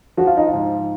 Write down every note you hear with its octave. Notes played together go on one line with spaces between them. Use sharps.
F3 F#4
F4
D#4
F4
G#2